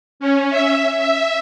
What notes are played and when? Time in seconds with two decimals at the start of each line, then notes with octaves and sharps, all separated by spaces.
0.20 C#4
0.50 E5
0.98 E5